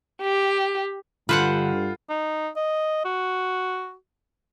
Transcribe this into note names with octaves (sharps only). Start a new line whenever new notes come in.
G4
G2 D3 F4 B4 C5 F#5
D#4
D#5
F#4